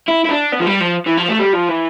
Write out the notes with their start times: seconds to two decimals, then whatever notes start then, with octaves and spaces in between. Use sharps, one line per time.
0.09 E4
0.25 E4
0.29 D4
0.52 B3
0.60 F3
0.67 G3
0.80 F3
1.07 E3
1.18 F3
1.29 A3
1.40 G3
1.53 F3
1.69 E3